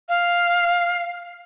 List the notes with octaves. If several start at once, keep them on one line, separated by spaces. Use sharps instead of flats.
F5